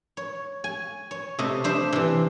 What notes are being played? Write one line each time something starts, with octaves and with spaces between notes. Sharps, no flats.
C#5
G#5
C#5
C3 A3 D#5
D4 C5 E5
C3 E3